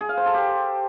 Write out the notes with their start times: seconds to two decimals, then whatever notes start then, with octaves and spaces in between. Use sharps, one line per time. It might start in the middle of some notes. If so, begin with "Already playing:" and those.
0.01 G#4
0.09 F5
0.17 C5
0.26 A4
0.34 G4